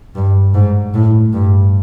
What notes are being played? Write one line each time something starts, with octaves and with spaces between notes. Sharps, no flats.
G2
G#2
A2
G2